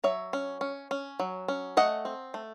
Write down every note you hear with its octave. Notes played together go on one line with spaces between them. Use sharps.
F#3 C#5 E5
C#4
C#4
C#4
F#3
C#4
A3 D#5 F#5
C4
A3